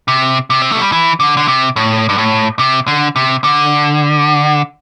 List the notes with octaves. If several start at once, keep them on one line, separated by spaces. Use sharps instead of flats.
C3
C3
C4
A3
G3
E3
D3
D3
C3
A2
G2
A2
C3
D3
C3
D3